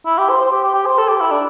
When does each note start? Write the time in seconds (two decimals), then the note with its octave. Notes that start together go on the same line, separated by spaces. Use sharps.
0.06 E4
0.18 G4
0.29 C5
0.41 C5
0.52 G4
0.63 G4
0.74 G4
0.86 C5
0.98 A4
1.08 G4
1.21 E4
1.31 D4